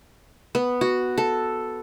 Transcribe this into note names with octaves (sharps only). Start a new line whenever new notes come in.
B3
F#4
A4